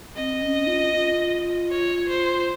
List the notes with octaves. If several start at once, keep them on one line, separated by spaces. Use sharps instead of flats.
C4 D#5
C#4
F4
F4
C#5
C5